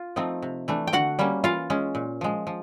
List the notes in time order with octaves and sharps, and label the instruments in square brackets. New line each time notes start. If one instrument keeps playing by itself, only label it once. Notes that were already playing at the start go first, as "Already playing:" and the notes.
Already playing: [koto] F4
F3 A3 C4 D#4
C3
E3 A3 D4
G5
D3 F#4 F#5
G3 A#3 C#4
E3 F4 F5
G#3 C#4
A#2
F3 G#3
F3